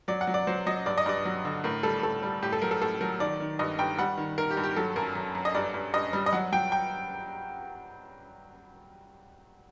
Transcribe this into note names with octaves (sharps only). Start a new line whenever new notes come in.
F#3 D5
F#5
F#3
D5
F#3 C5
F#3 D#5
G2 D5
D#5
G2 D5
F#3
D3
A2 A#4
G3 A4
A2 A4
G3
A2 G4
A4
F#3 A#4
A4
A2 A4
F#3 A#4
D#3 D5
D#3
G2 D#5
G2 G5
G3 F#5
D#3
D#3 A#4
G4
G2
G4
F#3 A4
F#2 A#4
F#2
F#2
D#5
G2 D5
G2
G2 D#5
G3
D#5
F#3 F#5
F#3 G5
G5